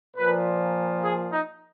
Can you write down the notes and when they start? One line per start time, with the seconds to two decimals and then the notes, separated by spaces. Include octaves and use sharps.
0.17 A#2 F3 B4
1.04 G#4
1.32 D#4